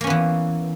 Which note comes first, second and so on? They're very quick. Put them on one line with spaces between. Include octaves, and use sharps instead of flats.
A#3 C#4 B3 E3